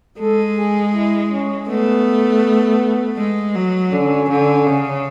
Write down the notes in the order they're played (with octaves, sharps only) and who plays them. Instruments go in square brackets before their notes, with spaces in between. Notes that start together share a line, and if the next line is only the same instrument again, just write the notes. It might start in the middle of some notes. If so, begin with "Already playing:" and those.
[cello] G#3 [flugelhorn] A4
[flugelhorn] G#4
E4
C#4
[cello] A3 [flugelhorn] B3
[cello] G#3
F#3
[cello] D3 [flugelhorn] C#4
[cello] D3
C#3